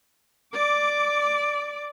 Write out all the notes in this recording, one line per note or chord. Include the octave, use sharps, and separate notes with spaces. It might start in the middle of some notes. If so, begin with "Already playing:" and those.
D5 D6